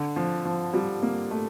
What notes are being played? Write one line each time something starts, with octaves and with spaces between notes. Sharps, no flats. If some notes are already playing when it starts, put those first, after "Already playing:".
Already playing: D3
F3
F3
G3
A#3
A3